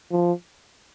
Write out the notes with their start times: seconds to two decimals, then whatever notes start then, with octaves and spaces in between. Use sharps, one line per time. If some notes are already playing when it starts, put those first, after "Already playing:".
0.12 F3